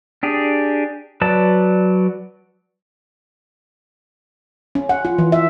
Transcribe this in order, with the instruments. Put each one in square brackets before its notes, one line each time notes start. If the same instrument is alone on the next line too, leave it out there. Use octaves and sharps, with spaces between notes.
[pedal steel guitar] D4 G4 G#4
F#3 B4 D5 A5
[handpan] C#4
F#5
F4
E3
E5